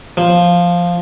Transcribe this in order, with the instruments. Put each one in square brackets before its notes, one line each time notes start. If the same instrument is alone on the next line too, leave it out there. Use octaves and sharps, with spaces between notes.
[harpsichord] F3